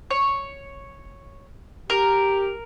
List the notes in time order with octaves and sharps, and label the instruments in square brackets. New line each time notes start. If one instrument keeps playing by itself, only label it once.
[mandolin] C#5
[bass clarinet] G4 [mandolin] A#4